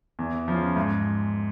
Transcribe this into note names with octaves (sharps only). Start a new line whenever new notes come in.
E2
C#3 F3
G#2